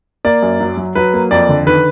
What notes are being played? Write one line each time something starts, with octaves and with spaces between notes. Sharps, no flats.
A#3 D5
F#2
F#3
F#3
F#3 B4
A#3
F2 D5
D3
D#3 B4